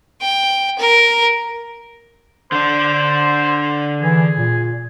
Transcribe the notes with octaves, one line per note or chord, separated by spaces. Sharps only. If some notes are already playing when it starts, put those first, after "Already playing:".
G5
A#4
D3 D4 C5
E3 G#4
A#2